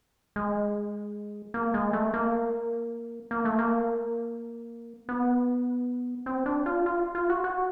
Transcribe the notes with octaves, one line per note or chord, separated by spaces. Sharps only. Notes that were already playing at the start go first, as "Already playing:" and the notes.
G#3
A#3
G#3
A3
A#3
A#3
A3
A#3
B3
C4
D4
F4
F4
F4
F#4
F#4